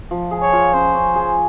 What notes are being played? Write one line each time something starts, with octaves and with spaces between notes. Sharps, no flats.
F3
G#4
C#5
F4
C#4 C5
C#4
G#4